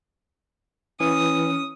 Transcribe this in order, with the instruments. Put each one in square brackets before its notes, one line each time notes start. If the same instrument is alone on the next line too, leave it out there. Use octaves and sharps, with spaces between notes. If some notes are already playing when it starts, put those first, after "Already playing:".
[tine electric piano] E3 [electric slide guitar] C#4 [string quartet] D#6